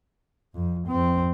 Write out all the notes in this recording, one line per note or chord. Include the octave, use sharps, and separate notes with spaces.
F2
F2 C4